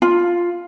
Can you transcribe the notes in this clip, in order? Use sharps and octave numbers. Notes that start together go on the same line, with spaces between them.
F4